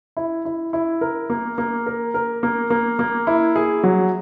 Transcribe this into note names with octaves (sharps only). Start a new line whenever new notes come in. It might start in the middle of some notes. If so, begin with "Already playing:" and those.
E4
E4
E4
A#4
A#3
A#3
A#4
A#4
A#3
A#3
A#3
E4
G#4
F#3